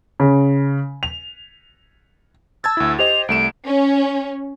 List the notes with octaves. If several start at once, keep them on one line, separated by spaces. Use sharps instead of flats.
C#3
F7
A5 E6 G#6 A6
D2 E4
G4 C5 D#5 F7
C2 A3 D7 E7
C#4